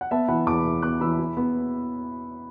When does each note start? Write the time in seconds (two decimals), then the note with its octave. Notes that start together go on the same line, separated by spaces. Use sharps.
0.01 F#5
0.11 B3 E5 A5
0.28 E3 F#5 B5
0.47 E2 A5 D6
0.65 E2
0.82 B3 D6 F#6
1.01 E3 B5 E6
1.19 E4
1.37 B3